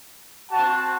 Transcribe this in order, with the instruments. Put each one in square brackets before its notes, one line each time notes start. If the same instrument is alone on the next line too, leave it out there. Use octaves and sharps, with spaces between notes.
[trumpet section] C4 F#4 F#5 A5